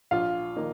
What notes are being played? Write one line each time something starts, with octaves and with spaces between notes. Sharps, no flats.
A#1 F4 F5
D#3 A#3 D#4